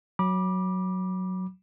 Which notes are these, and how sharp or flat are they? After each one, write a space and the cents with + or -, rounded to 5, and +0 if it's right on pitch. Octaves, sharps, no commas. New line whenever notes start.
F#3 +0 B5 -30 D6 +10